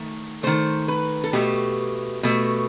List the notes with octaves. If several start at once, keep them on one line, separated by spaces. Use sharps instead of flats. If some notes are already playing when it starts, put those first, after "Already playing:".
Already playing: D#3 A3
D#3 A3 C5
B4
A4
B2 A3 G4
B2 A3